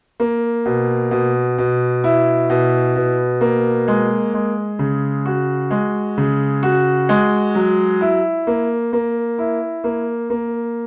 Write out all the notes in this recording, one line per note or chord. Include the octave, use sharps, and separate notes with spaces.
A#3
B2
B2
B2
E4
B2
B2
A#3
G#3
G#3
C#3
F#4
G#3
C#3
F#4
G#3
F#3
E4
A#3
A#3
E4
A#3
A#3